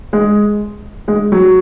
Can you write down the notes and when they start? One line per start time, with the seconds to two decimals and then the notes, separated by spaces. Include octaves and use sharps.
0.13 G#3
1.08 G#3
1.32 F#3